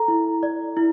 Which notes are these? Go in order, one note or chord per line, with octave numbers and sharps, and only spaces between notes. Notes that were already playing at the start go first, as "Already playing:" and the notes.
Already playing: A4 A#5
E4
D5
E4